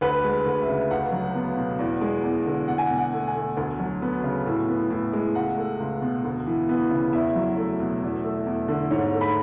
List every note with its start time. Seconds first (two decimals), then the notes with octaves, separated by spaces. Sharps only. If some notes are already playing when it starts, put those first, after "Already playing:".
0.01 D2 B4
0.24 G#3
0.46 D2
0.61 E5
0.68 C#3
0.91 C#2 F#5
1.12 F#3
1.35 B3
1.57 B2
1.79 E2
2.01 G#3
2.23 E2
2.46 D3
2.68 B2 F#5
2.78 G#5
2.87 F#5
2.91 B2
2.98 F#5
3.13 A3
3.28 G#5
3.35 A3
3.57 D2
3.80 F#3
4.02 B3
4.24 C#3
4.46 A2
4.69 B3
4.90 A2
5.13 G#3
5.35 C#2 F#5
5.57 A3
5.80 C#2
6.02 B2
6.24 D2
6.46 E3
6.69 B3
6.91 C#3
7.13 E2 E5
7.36 F#3
7.57 A3
7.80 B2
8.03 E2
8.24 A3
8.47 E2
8.68 D3
8.91 G#2 C#5
9.14 A3
9.21 B5